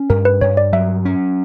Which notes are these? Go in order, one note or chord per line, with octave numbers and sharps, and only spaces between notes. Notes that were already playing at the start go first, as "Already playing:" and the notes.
Already playing: C#4
G2 A#4
B4
G2 C#5
D5
F#3 E5
C#4